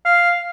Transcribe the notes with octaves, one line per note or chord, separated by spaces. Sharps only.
F5